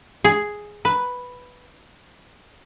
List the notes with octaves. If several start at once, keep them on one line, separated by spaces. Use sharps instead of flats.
G#4
B4